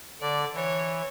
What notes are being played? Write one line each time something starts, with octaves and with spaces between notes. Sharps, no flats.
D3 D5
E3 C#5